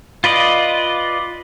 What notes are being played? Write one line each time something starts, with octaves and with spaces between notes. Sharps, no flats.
F4 B4 D5 D#5